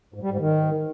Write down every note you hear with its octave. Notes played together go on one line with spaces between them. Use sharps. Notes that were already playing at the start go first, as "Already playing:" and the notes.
G#2
G3
G#2
D#3